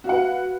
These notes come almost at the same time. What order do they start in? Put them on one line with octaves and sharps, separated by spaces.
F#4 F5 F#5 B4